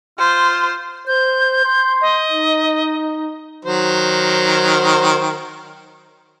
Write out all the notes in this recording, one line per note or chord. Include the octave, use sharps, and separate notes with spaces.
F4 C5
C5 G6
C6
D#5
D#4
D#3 F#3 C5